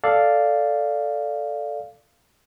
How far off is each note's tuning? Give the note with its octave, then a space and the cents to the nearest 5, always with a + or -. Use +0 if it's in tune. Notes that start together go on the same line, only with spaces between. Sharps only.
A4 +0 D5 +0 F5 -5